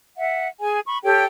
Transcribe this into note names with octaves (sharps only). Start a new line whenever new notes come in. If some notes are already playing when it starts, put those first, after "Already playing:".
E5 F#5
G#4 G#5
B5 C#6
G4 A4 C#5 G5